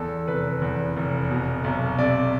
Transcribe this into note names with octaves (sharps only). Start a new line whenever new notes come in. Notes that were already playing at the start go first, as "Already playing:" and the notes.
Already playing: E2 A4
F1 B4
E2
F1
B2
B1
C3 D5